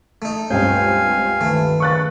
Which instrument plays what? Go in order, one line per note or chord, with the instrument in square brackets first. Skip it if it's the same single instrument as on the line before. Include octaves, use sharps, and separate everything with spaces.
[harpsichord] A3 D#4
[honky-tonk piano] C#2 G2 C4 [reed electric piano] C#5 G6 [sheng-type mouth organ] F5 G#5
[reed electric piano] D#3 B4 [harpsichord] A3
[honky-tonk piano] C#6 F#6 A6